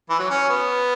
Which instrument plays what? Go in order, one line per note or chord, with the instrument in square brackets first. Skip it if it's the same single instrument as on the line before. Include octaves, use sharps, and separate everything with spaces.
[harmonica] E3
F#3
C#4
B3